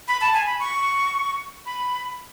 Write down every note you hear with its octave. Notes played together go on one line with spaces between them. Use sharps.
B5
A5
G#5
B5
C#6
B5